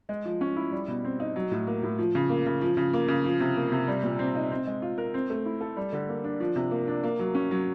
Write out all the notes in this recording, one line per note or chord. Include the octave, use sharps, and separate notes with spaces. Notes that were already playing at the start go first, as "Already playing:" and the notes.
G#3
F3
C#4
E4
G3
B2
C4
D#4
F#3
A2
A#3
A2
F3
C#3
A#3
C#3
F3
C#3
A#3
C#3
F3
C3
A#3
C3
G3
A#2
C4
D#4
C4
G#3
F4
A#4
C4
A3
E4
A4
G3
D3
A#3
D4
F3
C3
A#3
D4
A#3
F#3
C#4
F#3